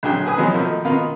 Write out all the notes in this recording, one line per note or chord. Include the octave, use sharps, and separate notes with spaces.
A#1 D3 F#3 G#4 G5
G#4 B4 G#5 D#6
F3 F#3 G#3 B3 D#4
B2 D#3 F3 A3 D#4
B2 D#3 B3 F4